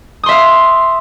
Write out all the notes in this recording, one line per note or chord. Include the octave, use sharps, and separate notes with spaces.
E5 F5 C6 D#6